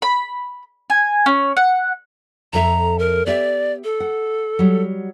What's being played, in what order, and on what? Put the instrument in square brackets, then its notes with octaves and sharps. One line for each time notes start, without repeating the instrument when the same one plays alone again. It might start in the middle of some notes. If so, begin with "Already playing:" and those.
[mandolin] B5
G#5
C#4
F#5
[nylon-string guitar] F2 A4 E5 [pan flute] A#5
[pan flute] A#4
[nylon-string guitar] B3 G4 E5 [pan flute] D5
[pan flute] A4
[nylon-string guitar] F#5
F#3 G3